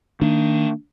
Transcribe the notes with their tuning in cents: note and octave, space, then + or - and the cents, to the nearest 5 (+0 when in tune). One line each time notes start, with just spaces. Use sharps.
D#3 +0 A#3 -40 D4 +0